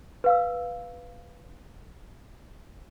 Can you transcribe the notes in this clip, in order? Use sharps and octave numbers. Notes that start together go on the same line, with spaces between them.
B4 F5 E6